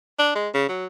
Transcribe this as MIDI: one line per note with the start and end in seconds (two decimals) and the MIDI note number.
0.19 0.33 62
0.35 0.49 56
0.54 0.67 49
0.69 0.86 54